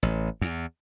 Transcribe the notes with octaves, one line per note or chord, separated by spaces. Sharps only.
A1
E2